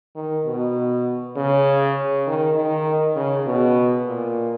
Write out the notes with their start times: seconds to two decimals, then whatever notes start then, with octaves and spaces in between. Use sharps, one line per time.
0.15 D#3
0.46 B2
1.36 C#3
2.27 D#3
2.56 D#3
3.16 C#3
3.46 B2
4.06 A#2